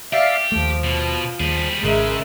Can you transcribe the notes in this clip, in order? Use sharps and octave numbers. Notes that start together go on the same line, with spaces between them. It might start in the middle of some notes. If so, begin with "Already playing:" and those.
G4 D5 E5 F5
D#2 F3 A3
B2
D#2 G3 G#4
G#1 C#3 G#3 A#4 E5